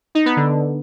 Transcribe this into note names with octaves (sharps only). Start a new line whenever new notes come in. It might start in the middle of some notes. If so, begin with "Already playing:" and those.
D#4
B3
D3